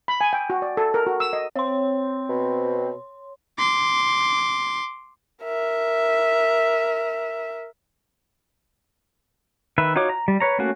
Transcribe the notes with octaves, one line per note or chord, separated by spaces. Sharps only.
B5
G#5
G5
F#4
D5
A4
A#4
F#4
E6
D#5
C4 C#5 C6
B2
C6 D6
A#4 E5
D#3 B4 E5
D#4 F4 F#4 C#5 D6
A#5
G3
B4 C#5 A#5
A3 A#3 C#4 F#4